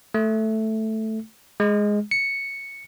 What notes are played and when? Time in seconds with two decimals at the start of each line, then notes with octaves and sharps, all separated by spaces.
0.14 A3
1.60 G#3
2.11 C#7